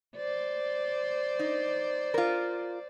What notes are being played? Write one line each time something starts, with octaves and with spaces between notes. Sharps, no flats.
C5 D5
D#4
F4 A#4